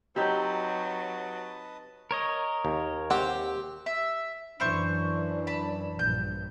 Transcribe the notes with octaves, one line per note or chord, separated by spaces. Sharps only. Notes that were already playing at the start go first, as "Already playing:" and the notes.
F#3 C4 D#4 G4 B4 D#5 A5 G6
A#4 C#5 D#5
D#2
C4 G4 F#5
E5
F#2 E3 D4 E4 C5 C#6
A5 B5
A#1 G2 G6